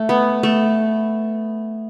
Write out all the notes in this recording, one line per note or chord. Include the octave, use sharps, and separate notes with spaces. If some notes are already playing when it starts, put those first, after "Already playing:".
Already playing: A3
B3
A3